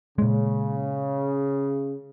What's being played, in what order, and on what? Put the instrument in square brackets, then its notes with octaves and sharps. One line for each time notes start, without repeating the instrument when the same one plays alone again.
[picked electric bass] A#2 G#3 [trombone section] C#3